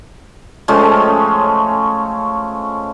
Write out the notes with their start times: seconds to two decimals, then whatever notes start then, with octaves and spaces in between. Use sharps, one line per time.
0.68 F3 G#3 A3 C#4